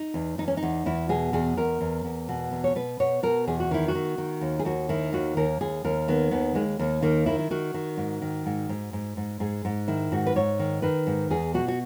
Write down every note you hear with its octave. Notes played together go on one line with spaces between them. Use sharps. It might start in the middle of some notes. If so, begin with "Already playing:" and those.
Already playing: D#4
E2
E2 D#4
C#4
D#4
E2
E2 E4
B2 G#4
E2 G#4
E2 A#4
E2
E2
B2
E2
C#5
B2 B4
B2 C#5
B2 A#4
E2 G#4
F#4
D#3 E4
F#4
D#3
D#3
D#2
G#4
D#2 F#4
D#3 E4
D#2 F#4
D#2 A#4
D#2 G#4
D#2 A#4
D#3 B3
D#2 B3
D#2 G#3
D#2 A#3
D#3 A#3
D#3 E4
E4
D#3 F#4
D#3
G#2
D#3
G#2
G#2
G#2
G#2
G#2 G#4
G#2
D#3 E4
G#2 F#4
B4
G#2 C#5
D#3
D#3 B4
G#2
E2 G#4
B2 F#4
F#4